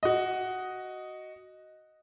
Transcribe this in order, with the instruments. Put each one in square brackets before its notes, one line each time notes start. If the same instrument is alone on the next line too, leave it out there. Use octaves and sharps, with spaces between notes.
[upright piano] F#4 D#5